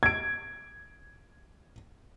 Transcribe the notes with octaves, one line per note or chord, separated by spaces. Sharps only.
G#6 D7